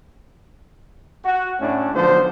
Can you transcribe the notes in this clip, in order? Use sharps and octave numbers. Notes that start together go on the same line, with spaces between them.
F#4
A2 A3 C#4 D4
B1 D3 F3 C5